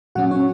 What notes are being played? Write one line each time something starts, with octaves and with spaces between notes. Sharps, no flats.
A#2 F#3 C#4 F#4 F#5
C#4 C#5